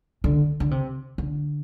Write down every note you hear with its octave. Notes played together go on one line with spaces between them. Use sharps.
D3
D3
C3
D3